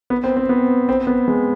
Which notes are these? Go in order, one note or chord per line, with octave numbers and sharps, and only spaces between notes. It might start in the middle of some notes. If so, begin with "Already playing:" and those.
B3
C4
C4
B3
C4
B3
G#3